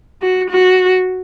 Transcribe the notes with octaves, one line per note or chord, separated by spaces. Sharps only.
F#4
F#4